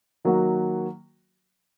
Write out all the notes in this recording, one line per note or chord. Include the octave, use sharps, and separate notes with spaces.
D#3 F#3 A#3 F#4